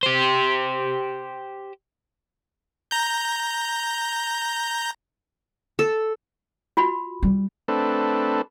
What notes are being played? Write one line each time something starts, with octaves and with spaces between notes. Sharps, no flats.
G4 C5
A#5 G6
A4
F4 F#4 B5
G3
A3 C4 D4 A4 B4